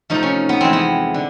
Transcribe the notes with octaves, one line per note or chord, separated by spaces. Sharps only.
C3 F3 A3 D#4
C#4
B3
F2 C3 E3 G#3 C4
B3
D3